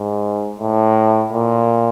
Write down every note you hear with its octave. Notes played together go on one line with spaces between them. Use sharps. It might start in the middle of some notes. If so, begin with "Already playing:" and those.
Already playing: G#2
A2
A#2